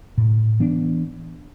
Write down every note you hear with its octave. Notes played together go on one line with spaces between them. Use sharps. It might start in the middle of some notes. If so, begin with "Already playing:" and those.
A2
E3 B3 D4